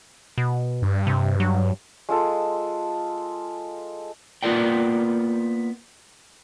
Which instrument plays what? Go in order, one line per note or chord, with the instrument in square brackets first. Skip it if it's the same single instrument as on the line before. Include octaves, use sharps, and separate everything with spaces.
[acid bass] B2
[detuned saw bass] G2
[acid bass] C3
F#3
[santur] G#3 F4 A4
[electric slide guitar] A#3 B3 F4 A#4 D5 G5